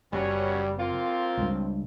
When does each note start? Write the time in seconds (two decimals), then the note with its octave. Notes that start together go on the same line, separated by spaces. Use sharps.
0.13 F#1 F#3 G3 B3 C#4
0.78 A#3 C4 F4
1.37 C#2 G2